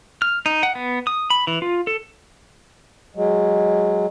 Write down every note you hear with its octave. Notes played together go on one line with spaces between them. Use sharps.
F6
D#4
F#5
B3
D#6
B5
E3
F4
A4
F#3 G#3